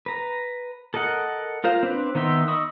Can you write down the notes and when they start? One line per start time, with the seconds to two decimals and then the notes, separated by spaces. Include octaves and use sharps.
0.06 B4 A#5
0.94 A4 A#4 D#5 F#5
1.64 F4 A#4 C5 F5
1.83 C4 D4 B4
2.15 D#3 B3 D#4 E5 C6
2.48 D#5 B5 C#6 D#6 E6